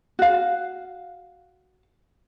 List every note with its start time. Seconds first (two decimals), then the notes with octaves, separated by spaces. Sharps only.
0.19 F#4 F5